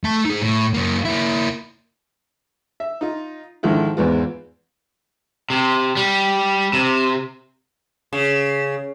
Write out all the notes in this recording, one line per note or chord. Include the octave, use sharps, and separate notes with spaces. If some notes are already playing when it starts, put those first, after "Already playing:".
A3 A5
D#4 G#4
A2
F#2 A#3
A#3 E4
E5
D#4 F4
G#2 D3 D#3 F3 E4
E2 G#2 B3 F4
C3
G3
C3
C#3